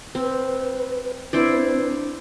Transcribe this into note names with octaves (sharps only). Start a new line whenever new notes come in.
C4 B4
C4 D4 E4 B4 C5 D5